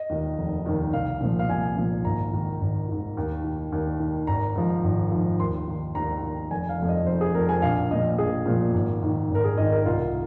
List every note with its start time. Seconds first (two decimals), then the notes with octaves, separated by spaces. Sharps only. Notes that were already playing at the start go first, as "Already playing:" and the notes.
Already playing: D#5
0.09 D#2 D#3
0.38 F1
0.66 D#2 D#3
0.93 C2 F5
1.21 A#2 F3
1.39 F5
1.49 C2 G#5
1.77 A#2 F3
2.05 G#1 A#5
2.32 G#2 D#3
2.61 G#1
2.88 G#2 D#3
3.17 D#2
3.44 D#3
3.72 D#2
4.00 D#3
4.27 G#1 A#5
4.56 G#2 F3
4.84 G#1
5.11 G#2 F3
5.39 D#2 C6
5.67 D#3
5.95 D#2 A#5
6.23 D#3
6.51 F1 G#5
6.69 F5
6.80 F2 F3
6.88 D#5
7.06 F1 C5
7.21 G#4
7.34 F2 F3 A#4
7.49 G#5
7.62 A#1 F5
7.91 A#2 D#5
7.95 F3
8.18 A#1 G#4
8.46 A#2 F3
8.74 G#1
9.02 G#2 D#3
9.30 G#1 A#4
9.44 G#4
9.58 G#2 D#3 D#5
9.72 A#4
9.85 C2 F4